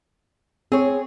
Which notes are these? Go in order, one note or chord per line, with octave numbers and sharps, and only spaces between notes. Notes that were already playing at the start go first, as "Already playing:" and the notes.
C4 G#4 C#5